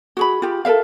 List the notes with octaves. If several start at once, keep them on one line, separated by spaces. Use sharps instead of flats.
F#4 G#4 B5
F4 G4 G#4
A4 A#4 E5 F5